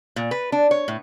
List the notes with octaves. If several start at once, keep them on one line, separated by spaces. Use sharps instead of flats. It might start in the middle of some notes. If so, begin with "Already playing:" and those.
A#2
B4
D4
C#5
A2